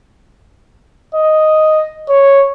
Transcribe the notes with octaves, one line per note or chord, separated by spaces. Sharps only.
D#5
C#5